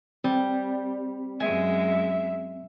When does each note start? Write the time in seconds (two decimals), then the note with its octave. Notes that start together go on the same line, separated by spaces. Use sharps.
0.24 G3 C4
1.40 F#2 G#3 E5 G#5